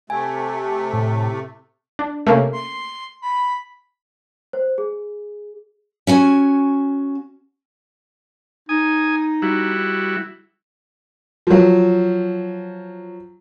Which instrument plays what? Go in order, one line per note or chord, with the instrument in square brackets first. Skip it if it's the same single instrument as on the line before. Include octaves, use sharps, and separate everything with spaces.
[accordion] C3 A3 [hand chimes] G#5
[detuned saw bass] A2
[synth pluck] D4
[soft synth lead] C3 [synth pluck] A3 A#3 C#4
[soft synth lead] C6
B5
[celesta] C5
G#4
[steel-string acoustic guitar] C#4 F#4 G#5
[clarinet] D#4 [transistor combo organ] G#5 D#6
[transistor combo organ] G3 E4 F#4
[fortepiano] F3 F#3